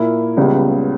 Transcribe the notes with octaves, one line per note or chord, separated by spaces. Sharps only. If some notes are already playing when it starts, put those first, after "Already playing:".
Already playing: A#2 A#3 E4
C#2 C#3 G3 B3